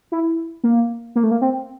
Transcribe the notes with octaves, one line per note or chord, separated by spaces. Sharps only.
E4
A#3
A#3
A3
A#3
C4